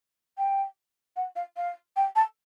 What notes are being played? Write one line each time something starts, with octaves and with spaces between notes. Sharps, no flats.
G5
F#5
F5
F5
G5
A5